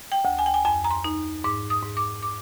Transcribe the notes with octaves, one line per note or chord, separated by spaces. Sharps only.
G5
D2
G#5
G5
G#5
F2 G#5
A#5
C6
D#4
G#2 D6
D#6
G#2
D6
D6